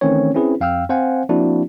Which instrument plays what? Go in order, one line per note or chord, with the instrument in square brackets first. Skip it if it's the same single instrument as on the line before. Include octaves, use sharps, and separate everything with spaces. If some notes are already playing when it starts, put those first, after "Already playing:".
[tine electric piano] D#3 E3 A3 C4 C#4 C#5
C4 C#4 E4 G#4 B4
F2 F5 G5 E6 F6
C4 C5 F5 F#5 G#5
F3 A#3 C4 D4 E4 F#4